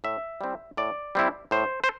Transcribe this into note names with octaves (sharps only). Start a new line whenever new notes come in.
A2 E5
G3 C4 E4
A2 D5
G3 C4 E4
A2 C5
C5